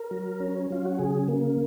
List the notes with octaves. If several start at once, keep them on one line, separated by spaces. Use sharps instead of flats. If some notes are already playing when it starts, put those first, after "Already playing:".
Already playing: A#4
F#3
C#4
F#3 F4
F#4
C#3 G#4
A#3